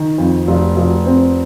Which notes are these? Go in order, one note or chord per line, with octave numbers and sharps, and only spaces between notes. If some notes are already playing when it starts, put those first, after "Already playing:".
Already playing: D#3
F2
F1
F1
C4